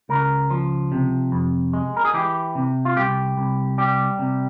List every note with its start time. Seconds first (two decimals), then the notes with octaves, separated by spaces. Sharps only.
0.09 C#2 A#4
0.51 F3
0.92 C3
1.32 F2
1.73 G#3
1.97 A#4
2.05 G#4
2.14 E3 G4
2.55 C3
2.85 F4
2.96 C2 G4
3.37 C2
3.78 G3 G4
4.19 C3